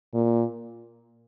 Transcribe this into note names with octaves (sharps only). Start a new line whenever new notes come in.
A#2